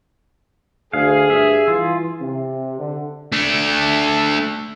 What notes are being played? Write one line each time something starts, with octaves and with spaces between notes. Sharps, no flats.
D2 G#4 F5
G2 E5
E3 F4
C3
D3
A3 D4